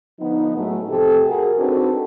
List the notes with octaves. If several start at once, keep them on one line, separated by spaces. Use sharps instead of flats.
D3 F3 B3 D#4
A2 F#3 G#3 A3
C3 F3 C4 G4 A4
F#4 G#4 A#4
C4 D4 D#4 F#4 A4 B4